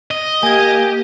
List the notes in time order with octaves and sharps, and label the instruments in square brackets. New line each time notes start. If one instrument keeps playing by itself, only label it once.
[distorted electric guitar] D#5
[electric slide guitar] A#3 [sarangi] G4 [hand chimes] G#5 G#6